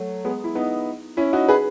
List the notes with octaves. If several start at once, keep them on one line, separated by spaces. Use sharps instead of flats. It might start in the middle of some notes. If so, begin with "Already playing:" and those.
Already playing: F#3 A3
G#3 B3
E4
B3 D#4
C#4 E4
D#4 F#4
G#4 B4